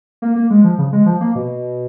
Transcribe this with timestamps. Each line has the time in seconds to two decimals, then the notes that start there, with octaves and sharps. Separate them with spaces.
0.22 A#3
0.35 A#3
0.50 G#3
0.64 F3
0.78 C#3
0.93 G#3
1.06 F3
1.21 A#3
1.35 B2